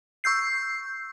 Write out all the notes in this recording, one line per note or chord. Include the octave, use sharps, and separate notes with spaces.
C#6 E6 G6 C7